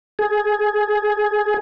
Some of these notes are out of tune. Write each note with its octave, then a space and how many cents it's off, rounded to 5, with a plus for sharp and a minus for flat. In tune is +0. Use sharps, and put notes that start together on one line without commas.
G#4 +15